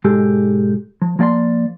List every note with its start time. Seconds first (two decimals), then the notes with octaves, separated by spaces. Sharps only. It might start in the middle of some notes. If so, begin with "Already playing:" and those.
0.04 B1 G#2 G#3 G4 A4
1.02 F3
1.19 F3 A#3 D5 G5 C6